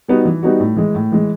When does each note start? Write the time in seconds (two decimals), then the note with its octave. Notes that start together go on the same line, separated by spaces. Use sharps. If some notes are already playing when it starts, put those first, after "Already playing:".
0.08 G3 B3 D#4 F#4
0.25 E3
0.43 G3 B3 D#4 F#4
0.60 A2
0.76 E3 G#3
0.95 A2
1.12 E3 G#3